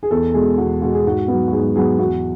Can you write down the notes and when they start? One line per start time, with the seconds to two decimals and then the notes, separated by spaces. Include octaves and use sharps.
0.03 G#4
0.11 E2 A4
0.34 B2 G#3 G#4
0.58 E2 F#4
0.82 B2 G#3 F#4
0.94 G#4
1.05 G#2 F#4
1.28 F#3 B3
1.48 F#4
1.52 G#2 G#4
1.76 F#3 B3 G#4
1.98 E2 F#4